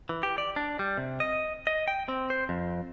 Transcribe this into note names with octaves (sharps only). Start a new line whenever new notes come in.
E3
G4
D5
D4
G3
C3
D#5
D#5
G5
C4
C5
F2